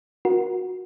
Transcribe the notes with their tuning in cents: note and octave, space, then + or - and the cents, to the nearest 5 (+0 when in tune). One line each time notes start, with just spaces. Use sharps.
F#4 -15 A#4 +25